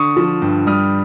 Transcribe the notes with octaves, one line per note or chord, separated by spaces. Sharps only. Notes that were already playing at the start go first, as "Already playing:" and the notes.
Already playing: D3 C#6 D#6
F3
G2
G3 D#6 F6